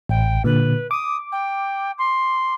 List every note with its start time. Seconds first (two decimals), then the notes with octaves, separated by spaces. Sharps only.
0.09 A1 G5
0.44 A#2 D3 B4
0.91 D6 D#6
1.32 G5
1.98 C6